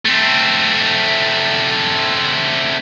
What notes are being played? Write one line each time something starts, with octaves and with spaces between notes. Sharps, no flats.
A3 C4